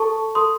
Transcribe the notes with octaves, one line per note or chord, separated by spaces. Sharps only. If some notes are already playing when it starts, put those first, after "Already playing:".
Already playing: A4 A5 C#6
A4 C6 D#6